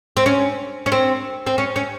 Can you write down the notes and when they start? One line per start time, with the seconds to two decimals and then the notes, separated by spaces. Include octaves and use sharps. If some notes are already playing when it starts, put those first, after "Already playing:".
0.17 C4
0.26 C#4
0.86 C#4
0.92 C4
1.47 C4
1.58 C#4
1.76 C#4